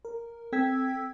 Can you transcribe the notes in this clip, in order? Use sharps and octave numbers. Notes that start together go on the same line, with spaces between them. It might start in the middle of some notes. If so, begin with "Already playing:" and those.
A#4
C4 A4 G5 E6 G#6 B6